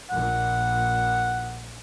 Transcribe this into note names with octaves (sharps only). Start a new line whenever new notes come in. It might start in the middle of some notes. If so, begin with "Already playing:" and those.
A#1 A#2 F#5